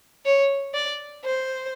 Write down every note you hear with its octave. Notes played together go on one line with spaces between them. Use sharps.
C#5
D5
C5